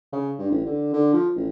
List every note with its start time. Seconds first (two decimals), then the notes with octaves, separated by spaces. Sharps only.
0.13 C#3
0.39 G2
0.51 A1
0.66 D3
0.93 D3
1.13 F3
1.36 A1